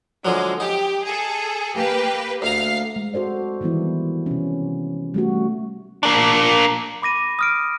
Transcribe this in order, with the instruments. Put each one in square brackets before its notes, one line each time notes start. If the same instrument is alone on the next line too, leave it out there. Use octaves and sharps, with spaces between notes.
[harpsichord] D3 F3 F#3 [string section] G#3
[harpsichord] D#4 [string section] G4
[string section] G#4 A4
A#3 G4 B4
[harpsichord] D2 A#5 [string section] F5
[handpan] G#3
F#4 A4 C5 D5
D#3 E3 G3 B3 E4
C3 C#4
G3 A3 F#4
[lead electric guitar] A#3 D4
[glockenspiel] B5 D6 A#6 D#7
D#6 F6 D7